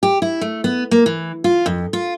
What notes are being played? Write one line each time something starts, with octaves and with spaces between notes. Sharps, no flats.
G4
E4
A3
B3
A#3
E3
F4
F2
F4